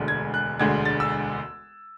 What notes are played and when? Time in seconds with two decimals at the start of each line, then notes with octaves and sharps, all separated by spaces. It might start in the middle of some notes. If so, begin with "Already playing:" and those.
Already playing: E1 D2 D3 G#3
0.08 G#6
0.34 F#6
0.59 E1 D2 D3 G#3 G#6
0.85 A6
1.00 E6